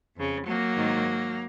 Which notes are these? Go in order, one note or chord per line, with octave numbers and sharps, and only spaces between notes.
F2 C#3
F#3 A#3
G#2 D#3